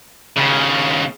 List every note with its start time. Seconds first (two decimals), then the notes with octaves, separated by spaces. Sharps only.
0.37 D#2 C#3